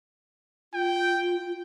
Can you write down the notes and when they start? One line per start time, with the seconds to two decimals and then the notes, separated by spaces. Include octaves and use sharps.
0.74 F4 G5